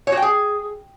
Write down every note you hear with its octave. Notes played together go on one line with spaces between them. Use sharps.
C#5
F#4
G5
G#4